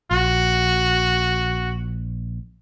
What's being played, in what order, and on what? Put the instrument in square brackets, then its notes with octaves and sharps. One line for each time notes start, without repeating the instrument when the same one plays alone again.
[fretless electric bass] A#1 [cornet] F#4